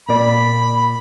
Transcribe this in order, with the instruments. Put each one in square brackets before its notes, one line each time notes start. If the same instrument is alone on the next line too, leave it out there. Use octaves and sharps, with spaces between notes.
[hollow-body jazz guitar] A#2 A#3 D5 [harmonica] B5